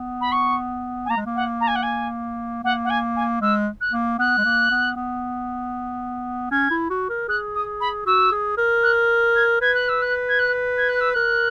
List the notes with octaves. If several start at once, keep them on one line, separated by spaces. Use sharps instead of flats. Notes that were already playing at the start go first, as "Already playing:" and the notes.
Already playing: B3
B5
C#6
G#5
A#3 A#5
G#3
A#3
F#5
A#5
G#5
F#5
G#5
A#3 F#5
F#5
G#5
G#5
G#3 E6
F#6
A#3
B3 F#6
G#3
A#3
B3
B3
C#4 G#6
E4
F#4
A#4
G#4 F#6
D#6
B5
F#4 E6
G#4
A#4
F#6
G#6
B4 G#6
F#6
E6
F#6
G#6
F#6
G#6
F#6
E6
A#4 F#6